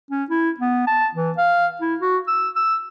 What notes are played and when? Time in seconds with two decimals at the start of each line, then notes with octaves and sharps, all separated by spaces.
0.11 C#4
0.30 E4
0.59 B3
0.87 A5
1.15 E3
1.38 F5
1.81 E4
2.00 F#4
2.27 E6
2.56 E6